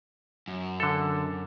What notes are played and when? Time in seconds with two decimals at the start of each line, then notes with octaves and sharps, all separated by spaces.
0.48 F#2
0.80 D3 A4